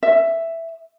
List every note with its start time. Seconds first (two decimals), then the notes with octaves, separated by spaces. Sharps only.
0.03 E5